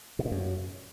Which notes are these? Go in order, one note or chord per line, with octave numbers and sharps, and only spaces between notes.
B2
A#2
F#2